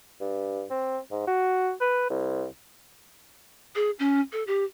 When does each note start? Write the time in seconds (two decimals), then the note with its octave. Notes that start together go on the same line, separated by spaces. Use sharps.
0.21 G2
0.70 C4
1.11 G#2
1.27 F#4
1.81 B4
2.10 C2
3.75 G#4
3.99 C#4
4.33 A4
4.47 G4